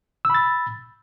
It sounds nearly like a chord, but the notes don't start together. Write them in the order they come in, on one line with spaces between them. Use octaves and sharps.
E6 B5 A6